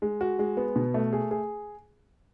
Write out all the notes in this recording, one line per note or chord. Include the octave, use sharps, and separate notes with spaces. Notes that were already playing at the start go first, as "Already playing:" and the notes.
G#3
F#4
G#3
B3
B2
A3
G#4
G#4